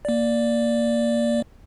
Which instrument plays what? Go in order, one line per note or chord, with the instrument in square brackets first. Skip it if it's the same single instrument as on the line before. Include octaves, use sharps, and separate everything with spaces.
[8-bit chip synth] A#3 D5